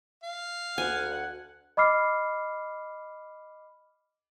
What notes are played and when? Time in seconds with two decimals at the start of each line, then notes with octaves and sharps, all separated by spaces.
0.23 F5
0.78 D2 F#5 G#5
1.77 D#5 B5 D6 F6 C7